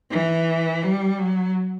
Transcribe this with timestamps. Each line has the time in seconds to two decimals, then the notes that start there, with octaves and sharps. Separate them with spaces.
0.11 E3
0.83 G3
1.18 F#3